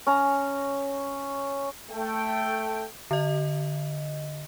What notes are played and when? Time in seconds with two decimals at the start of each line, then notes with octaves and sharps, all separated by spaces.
0.07 C#4 A#5
1.91 A3 G5
3.11 D3 D#5